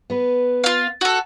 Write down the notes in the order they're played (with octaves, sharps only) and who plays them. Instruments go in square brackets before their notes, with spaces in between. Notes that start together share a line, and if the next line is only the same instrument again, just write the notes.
[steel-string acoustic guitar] B3 B4
[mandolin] F4 F5
F#4 A4